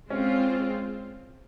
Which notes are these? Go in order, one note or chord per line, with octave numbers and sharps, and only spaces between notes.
G#3 C4 C#4 F4